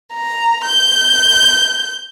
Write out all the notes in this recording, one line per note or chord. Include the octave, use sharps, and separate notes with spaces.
A#5
G6